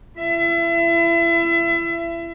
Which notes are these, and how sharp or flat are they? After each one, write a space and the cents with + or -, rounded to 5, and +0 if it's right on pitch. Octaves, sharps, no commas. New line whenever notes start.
E4 +35 E5 +30